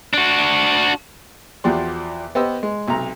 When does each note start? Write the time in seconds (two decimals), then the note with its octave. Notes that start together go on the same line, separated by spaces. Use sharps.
0.13 D4 F#4
1.64 E2 F3 F#4 G4 D5 C6
2.35 B3 G4 B4 C5 D#5 E6
2.63 G#3
2.88 B1 C3 A#5